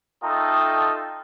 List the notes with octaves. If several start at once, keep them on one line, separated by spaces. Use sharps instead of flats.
A3 D#4 F4 A4 D#5 G5